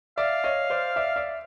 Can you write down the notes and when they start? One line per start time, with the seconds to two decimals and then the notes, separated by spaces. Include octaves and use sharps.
0.18 D5 E5 F5
0.44 C#5 D#5
0.70 C5 D5
0.96 D5 E5
1.16 D5 E5